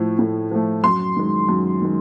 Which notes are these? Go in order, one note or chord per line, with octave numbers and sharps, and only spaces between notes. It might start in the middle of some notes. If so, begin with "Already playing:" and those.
Already playing: A2 F3 A3
A2
F3 A3
F#2 C6
D#3 G#3
F#2
D#3 G#3